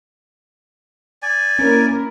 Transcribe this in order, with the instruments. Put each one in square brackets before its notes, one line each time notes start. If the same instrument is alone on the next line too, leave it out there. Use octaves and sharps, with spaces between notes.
[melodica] D5 G#5
[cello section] A#3 E4 A#4 [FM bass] C#4